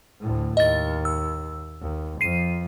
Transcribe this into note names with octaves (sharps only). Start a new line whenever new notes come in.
D2 A2
D#2 D#5 A6
E6
D#2
F2 F3 C7 D#7